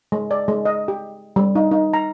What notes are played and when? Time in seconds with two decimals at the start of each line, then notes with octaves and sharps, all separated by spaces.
0.12 G#3
0.31 D5
0.48 G#3
0.65 D#5
0.88 G4
1.36 G3
1.55 D#4
1.71 D#4
1.93 A#5